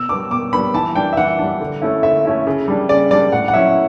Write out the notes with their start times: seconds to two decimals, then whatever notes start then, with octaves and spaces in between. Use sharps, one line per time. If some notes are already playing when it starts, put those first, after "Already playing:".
Already playing: B2 E6
0.09 G3 B3 D4 D6
0.31 B2 D6
0.53 G3 B3 D4 B5
0.74 E3 A5
0.95 G3 D4 G5
1.13 E5
1.17 E3 F#5
1.39 G3 D4
1.60 D3
1.82 A3 C#4 E4
2.03 D3 E5
2.25 A3 C#4 E4
2.47 C#3
2.68 G3 D4
2.89 C#3 D5
3.11 G3 D4 D5
3.32 A2 F#5
3.48 F#5
3.54 F#3 C#4 E4 E5